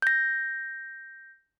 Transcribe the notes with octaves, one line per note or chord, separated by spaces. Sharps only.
G6 A#6